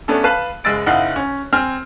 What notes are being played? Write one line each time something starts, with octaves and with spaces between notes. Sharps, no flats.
A3 B3 C#4 D4 A4
B4 F5 A5 F#6
F#1 G#3 E6 A6 D7
F#1 D#4 E4 F5 F#5 F#6
C#4
C4 G#5 F6